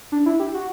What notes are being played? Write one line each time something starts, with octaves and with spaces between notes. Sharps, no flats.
D4
E4
G4
F#4